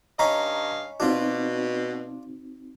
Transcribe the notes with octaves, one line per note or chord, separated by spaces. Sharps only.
G2 C#4 D#4 D#5 F5 A#5 B5
B2 C4 D4 D#4 F4 F#4